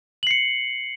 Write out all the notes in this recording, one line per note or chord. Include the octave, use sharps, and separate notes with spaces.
C7 C#7 F#7